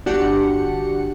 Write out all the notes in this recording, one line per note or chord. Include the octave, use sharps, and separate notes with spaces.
G1 D4 F#4 G4 F#5 C#7